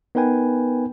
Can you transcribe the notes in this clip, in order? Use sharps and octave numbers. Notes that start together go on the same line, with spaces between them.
B3 D#4 A#4 B4 G5 G#5